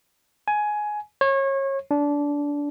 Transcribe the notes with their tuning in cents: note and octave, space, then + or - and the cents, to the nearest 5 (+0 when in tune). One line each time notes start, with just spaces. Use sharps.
G#5 +15
C#5 -30
D4 -20